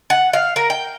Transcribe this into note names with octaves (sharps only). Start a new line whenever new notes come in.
F#5
F5
A#4
G5